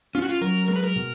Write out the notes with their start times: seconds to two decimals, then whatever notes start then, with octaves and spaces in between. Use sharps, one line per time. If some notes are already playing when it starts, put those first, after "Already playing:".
0.15 C#4 F4
0.22 F#4
0.29 F4
0.41 F#3 A#4
0.68 G#3 A#4
0.76 B4
0.84 A#4
0.96 B2